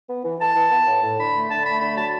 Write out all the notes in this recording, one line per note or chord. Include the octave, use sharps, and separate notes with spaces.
B3
E3
E3 A5
E3
B3
A2
A2
D3 B5
A3
D3 A5
A3 B5
D3 B5
F#3 A5